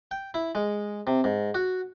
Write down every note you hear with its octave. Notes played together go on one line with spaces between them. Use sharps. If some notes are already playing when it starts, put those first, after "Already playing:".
G5
E4
G#3
C3
G#2
F#4